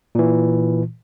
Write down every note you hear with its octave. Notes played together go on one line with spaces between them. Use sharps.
A#2 E3